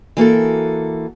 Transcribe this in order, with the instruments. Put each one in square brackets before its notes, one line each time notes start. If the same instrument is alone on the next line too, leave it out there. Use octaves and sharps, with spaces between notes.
[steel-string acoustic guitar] E3 A#3 F#4 A4